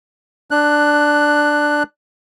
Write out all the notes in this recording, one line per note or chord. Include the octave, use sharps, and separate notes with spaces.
D4 F#6